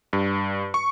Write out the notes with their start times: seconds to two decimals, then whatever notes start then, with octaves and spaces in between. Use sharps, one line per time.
0.13 G2
0.74 C#6